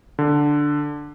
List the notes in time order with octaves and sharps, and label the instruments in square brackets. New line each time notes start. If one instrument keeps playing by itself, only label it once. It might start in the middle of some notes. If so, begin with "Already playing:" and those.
[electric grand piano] D3